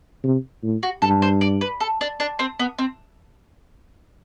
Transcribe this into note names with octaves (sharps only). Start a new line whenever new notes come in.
C3
A2
F#4
G2 A4
C5
D5
B4
A4
D4
D4
C4
B3
C4